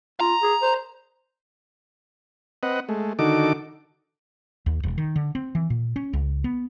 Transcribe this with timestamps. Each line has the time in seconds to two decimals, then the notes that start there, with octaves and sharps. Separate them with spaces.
0.20 F4 A#5
0.43 G#4
0.62 C5
2.63 C4 B4 D#5 F#5
2.89 G#3 A3
3.19 D3 D#3 D#4 F#4 A4 D6
4.66 D#2
4.83 E1
4.98 D#3
5.16 D3
5.35 C4
5.55 E3
5.70 A#2
5.96 C#4
6.13 C#2
6.44 B3